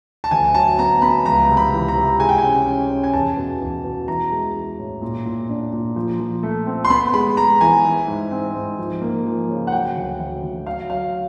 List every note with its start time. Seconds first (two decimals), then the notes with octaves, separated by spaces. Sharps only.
0.24 A5
0.31 D2 G#5
0.54 F#3 A5
0.79 B3 A#5
1.02 B3 B5
1.25 C#2 A#5
1.49 C3
1.57 B5
1.73 E3
1.88 A#5
1.97 C3
2.19 G#3 G#5
2.29 G5
2.38 G#5
2.43 C#4
2.67 C#4
2.90 C#4
3.04 G#5
3.13 E2 A5
3.37 B2
3.61 E2
3.84 B2
4.07 E3 A#5
4.31 G#3
4.55 G#3
4.79 A2
5.02 A#2
5.26 A#2
5.49 D4
5.72 A#2
5.96 F3
6.20 F3
6.43 A3
6.67 C4
6.85 C6
6.90 B3 B5
7.14 G#3 B5
7.37 G#3 A#5
7.61 E3 G#5
7.85 E3
8.08 G#2
8.31 C4
8.55 G#2
8.79 F3
9.02 A#3
9.25 F3
9.49 C#3
9.67 F#5
9.72 F#3 G5
9.96 D2
10.19 D2
10.43 D2
10.67 F#3 F5
10.90 F#3 F5